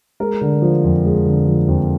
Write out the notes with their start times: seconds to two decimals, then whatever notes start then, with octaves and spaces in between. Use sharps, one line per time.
0.20 G#3 A#4
0.41 D3
0.62 F3
0.84 F2
1.05 G#3
1.26 D3
1.47 F3
1.68 F2